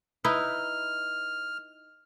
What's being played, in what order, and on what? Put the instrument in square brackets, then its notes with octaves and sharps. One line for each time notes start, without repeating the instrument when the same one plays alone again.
[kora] D#4 E4 B4 [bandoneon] F6